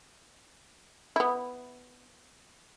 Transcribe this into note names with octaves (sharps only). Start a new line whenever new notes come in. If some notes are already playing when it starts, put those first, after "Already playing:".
B3 E4